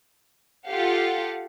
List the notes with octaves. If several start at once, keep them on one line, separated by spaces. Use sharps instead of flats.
F4 G4 A4 F5 F#5